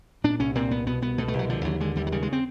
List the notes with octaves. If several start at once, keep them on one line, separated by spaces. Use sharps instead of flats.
A#2 D4
C2 C#4
A#2 C4
C2 B3
B2 B3
C2 B3
B2 A3
A3
C2
F#3
D3 F3
D#2 F#3
D3 G#3
D#2 G3
F#3
C#3 G3
G#3
C4